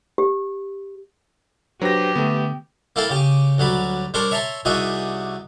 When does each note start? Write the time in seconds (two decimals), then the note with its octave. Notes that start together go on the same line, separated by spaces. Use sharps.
0.18 G4
1.82 F#3 D4 G4 B4 C5 A#6
2.15 D3 A3 B3
2.96 A#3 E4 A4 F5 G5 A5
3.10 C#3 G4
3.58 D2 F#3 G3 B5
4.14 G3 D4 A#4 C5 C#5 D6
4.31 C#5 E5 A5 A#5 C6
4.65 C2 G3 D#4 F#4 G#4 E5